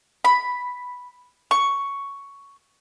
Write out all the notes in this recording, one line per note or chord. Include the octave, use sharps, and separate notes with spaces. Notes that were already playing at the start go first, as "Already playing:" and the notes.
B5
C#6